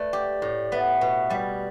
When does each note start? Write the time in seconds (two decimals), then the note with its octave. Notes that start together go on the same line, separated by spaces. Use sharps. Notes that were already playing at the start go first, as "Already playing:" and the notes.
Already playing: A3 B4 D5
0.13 G4
0.42 A2
0.72 B3 E5
1.01 B2
1.30 G3 D5